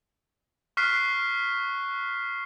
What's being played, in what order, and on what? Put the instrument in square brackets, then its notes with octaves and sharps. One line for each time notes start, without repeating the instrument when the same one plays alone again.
[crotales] C#6 F6 F#6 B6 C7